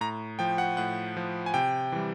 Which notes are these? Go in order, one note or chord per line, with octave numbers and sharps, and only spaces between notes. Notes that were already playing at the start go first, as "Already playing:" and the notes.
A2 A#5
F3 G5
F#5
A2 F#5
F3
G#5
C3 G5
E3 G3